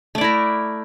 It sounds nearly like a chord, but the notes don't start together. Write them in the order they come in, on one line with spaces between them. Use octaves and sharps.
A3 D5 E4 A#4